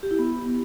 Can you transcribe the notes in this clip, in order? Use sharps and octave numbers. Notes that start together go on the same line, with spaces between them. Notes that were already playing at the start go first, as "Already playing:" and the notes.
G4
E4
B3